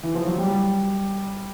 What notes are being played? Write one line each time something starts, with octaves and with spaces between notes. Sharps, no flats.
E3
F3
F#3
G3